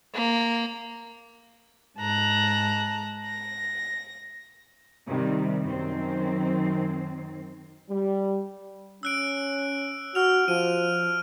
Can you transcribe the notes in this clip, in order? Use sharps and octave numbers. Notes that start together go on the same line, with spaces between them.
A#3
G#2 A5 A#5 F#6
A#6
C3 D#3 G3
F#2 D#3 C4
G3
C#4 E6 F#6 D7
F#4 F6 F7
F3 D#7